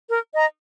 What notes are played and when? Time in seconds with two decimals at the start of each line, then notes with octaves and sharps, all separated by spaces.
0.09 A#4
0.34 D#5 A#5